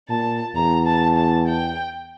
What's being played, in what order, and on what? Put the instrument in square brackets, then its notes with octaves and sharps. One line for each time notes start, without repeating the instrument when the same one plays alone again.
[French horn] A#2 [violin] A5
[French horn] E2 [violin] A#5
[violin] A5
A5
G5